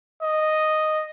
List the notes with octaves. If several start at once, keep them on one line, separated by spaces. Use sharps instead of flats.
D#5